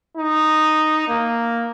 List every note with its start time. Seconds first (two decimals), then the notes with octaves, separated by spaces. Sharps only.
0.17 D#4
1.08 A#3